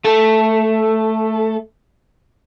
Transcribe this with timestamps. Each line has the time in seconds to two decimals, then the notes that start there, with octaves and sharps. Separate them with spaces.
0.05 A3 A4